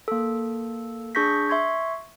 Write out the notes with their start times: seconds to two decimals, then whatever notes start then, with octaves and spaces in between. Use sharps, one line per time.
0.08 A#3 A4
1.15 D4 G#4 C#6 G6 A#6 B6
1.49 E5 C6 C#6 G#6